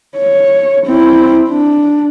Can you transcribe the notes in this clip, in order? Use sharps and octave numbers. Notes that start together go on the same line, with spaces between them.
C#5
C4 E4
D4